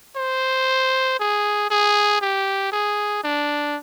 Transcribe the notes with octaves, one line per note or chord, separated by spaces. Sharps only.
C5
G#4
G#4
G4
G#4
D4